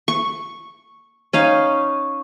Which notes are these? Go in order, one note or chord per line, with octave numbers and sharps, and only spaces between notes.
C#6
C#4 D#4 F5